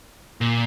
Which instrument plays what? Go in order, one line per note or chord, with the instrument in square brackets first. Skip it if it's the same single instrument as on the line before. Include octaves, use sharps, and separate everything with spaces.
[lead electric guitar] A#2